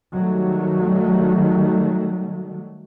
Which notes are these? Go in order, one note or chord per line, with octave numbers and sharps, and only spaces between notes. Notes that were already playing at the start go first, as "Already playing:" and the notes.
D#3 F#3 G3 A3